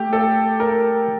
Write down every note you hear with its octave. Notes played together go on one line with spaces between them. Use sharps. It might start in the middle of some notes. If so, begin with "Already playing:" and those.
Already playing: A3 G4
A4
A#4